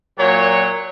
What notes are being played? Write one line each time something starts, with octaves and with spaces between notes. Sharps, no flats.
A#2 F#3 C#5